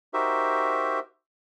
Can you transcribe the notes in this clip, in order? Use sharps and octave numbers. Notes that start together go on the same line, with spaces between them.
D#4 F#4 G4 A#4 C5 E5